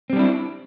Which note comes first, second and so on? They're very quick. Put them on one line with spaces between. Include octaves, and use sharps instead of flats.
C4 G3 D4 E4